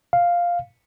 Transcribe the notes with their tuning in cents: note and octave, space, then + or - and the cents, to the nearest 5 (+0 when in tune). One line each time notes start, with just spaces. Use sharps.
F5 +0